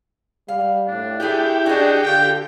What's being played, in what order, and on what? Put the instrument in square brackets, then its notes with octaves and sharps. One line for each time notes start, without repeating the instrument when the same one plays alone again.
[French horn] G3 [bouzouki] F5
[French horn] A2 [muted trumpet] D4
[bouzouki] A3 G#4 G#5 [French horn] E4 [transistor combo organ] G4
[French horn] D4 [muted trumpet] F#4 [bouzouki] G#4 D#5
[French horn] D3 [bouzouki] F4 A4 [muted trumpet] G5